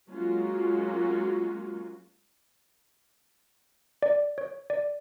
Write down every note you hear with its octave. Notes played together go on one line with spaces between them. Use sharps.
F#3 G#3 A#3 C#4 F4 F#4
D5
C#5
D5